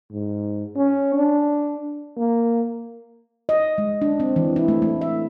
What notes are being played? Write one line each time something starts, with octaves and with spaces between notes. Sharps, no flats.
G#2
C#4
D4
A#3
D#5
G#3
D4
C4
E3
E4
A3
A3
E5